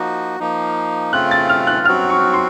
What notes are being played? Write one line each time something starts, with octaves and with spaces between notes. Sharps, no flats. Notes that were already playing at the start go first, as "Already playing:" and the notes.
Already playing: F3 A#3 D#4 F#4
F3 A#3 D#4
C#3 A3 C4 F4 F#6
A6
F6
F#6
F#3 C4 F#4 F6
C#6
C6